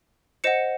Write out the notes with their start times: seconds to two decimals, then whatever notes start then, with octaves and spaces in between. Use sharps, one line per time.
0.44 C5 D#5 F#5 C#7 E7